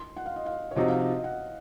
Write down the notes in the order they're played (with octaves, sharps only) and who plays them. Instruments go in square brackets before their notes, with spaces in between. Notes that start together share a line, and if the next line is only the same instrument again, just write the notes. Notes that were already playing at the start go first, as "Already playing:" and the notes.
Already playing: [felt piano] C6
F#5
F5
D#5
F5
C#5
[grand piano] C3 F3 C4 D#4 F#4 [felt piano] D#5
[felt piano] F5
D#5
D#5
F#5